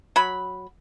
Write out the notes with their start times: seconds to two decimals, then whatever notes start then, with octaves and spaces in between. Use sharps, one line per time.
0.16 F#3 B5